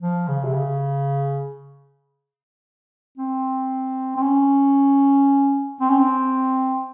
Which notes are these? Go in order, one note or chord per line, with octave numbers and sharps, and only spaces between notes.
F3
C#3
C3
C#3
C4
C4
C#4
C4
C#4
C4